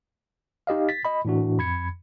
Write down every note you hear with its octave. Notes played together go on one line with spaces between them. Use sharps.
D#4 G4 D#5 F5
A6 B6
D#5 B5
A2 E3 D4 F#4
F2 B5 G#6 C#7